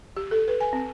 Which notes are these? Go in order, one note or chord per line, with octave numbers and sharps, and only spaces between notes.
G4
A4
B4
G#5
C4